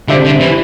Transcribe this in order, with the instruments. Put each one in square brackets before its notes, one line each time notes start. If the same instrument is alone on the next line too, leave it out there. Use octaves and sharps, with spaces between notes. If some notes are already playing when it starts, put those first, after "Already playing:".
[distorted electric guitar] D3 [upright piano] G3 D4 C5 E5
[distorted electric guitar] D3
E3